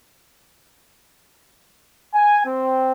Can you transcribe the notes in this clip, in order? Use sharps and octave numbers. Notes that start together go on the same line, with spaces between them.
G#5
C4